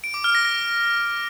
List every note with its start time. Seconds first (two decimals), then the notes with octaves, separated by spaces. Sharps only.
0.04 D7
0.14 D6
0.24 F6
0.35 A#6
0.45 A#6